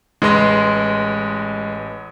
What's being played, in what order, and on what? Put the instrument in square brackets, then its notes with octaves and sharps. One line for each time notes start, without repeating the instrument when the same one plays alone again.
[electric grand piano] A1 B4 D#5 [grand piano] G#3 C6